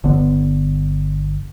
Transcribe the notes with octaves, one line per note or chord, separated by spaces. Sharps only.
G1 D3 B3